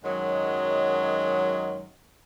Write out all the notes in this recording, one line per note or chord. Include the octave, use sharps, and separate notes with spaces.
F#2 D#3 F#3 G#3